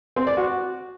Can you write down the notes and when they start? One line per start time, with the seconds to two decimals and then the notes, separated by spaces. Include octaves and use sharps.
0.16 C4
0.27 D5
0.37 F#4